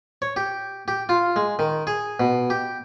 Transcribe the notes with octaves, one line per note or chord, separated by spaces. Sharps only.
C#5
G4
G4
F4
G#3
D#3
G#4
B2
G4